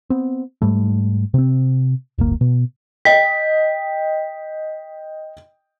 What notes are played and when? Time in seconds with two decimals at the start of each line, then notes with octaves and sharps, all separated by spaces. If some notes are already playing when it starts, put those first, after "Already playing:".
0.10 B3 C4
0.62 G#2 G3 A3
1.34 C3 C4
2.18 D1 G1 A#3
2.41 B2
3.05 D#5 G5 B6